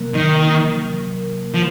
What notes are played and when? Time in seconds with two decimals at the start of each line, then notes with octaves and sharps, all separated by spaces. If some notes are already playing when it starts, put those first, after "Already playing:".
Already playing: C3 F#3 A#3 A#4
0.14 D#3
1.54 F3